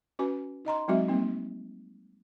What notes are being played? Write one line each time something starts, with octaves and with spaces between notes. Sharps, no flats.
C#4 F#4 B4 G#5
D#4 D#5 A#5 C6
F#3 G#3 C4 D#4 F#4 E5
G3 A#3 C4 D#4